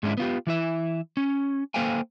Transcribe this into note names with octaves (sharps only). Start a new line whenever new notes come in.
G#2 G#3 C#4 D4 E4
B3 F4 G4
E3 E4 E5
C#4
A#3 A4 C5 F5 G5 G#5